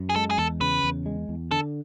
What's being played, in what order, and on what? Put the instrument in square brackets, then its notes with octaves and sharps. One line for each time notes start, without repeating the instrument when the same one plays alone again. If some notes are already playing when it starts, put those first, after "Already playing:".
Already playing: [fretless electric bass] F#2
[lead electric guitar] G#4
[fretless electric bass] G#3 [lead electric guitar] A4
[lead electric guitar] G#4
[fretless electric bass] E2 [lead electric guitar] A4
[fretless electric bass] C#3 [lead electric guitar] B4
[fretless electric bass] E2
G#3
E2
[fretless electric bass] D3 [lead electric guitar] A4